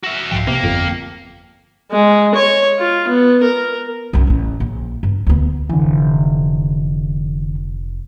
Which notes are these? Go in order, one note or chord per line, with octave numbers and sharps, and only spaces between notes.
F#4 E5
C2 G#2 F3 F5 G5
C3 A#3 B3
G1 F2
G#3
C#5
F4
B3
A#4
B1 F#2
A1 C#4
A#1
G2
D2 B3
F1 D3 E3